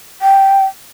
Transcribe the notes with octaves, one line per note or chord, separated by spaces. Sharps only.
G5